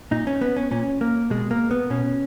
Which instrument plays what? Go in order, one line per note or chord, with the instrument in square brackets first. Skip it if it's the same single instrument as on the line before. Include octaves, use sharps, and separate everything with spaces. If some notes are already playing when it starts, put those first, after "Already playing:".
[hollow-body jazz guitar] A#2 D#4
C#4
B3
C#4
A#2 C#4
A#3
B2 G#3
A#3
B3
B2 C#4